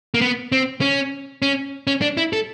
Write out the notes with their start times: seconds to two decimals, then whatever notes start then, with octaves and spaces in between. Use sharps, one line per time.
0.14 A#3
0.21 B3
0.52 C4
0.81 C#4
1.42 C#4
1.87 C#4
2.02 D4
2.17 E4
2.33 A4